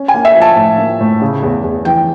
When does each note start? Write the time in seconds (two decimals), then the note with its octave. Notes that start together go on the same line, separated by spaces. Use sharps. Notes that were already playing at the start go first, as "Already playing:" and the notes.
Already playing: C#4
0.08 G#5
0.14 A#3
0.25 E5
0.35 F3
0.41 A5
0.57 A2
0.78 A#3
1.01 A2
1.22 C#3
1.43 E2
1.64 E2
1.85 E3 G5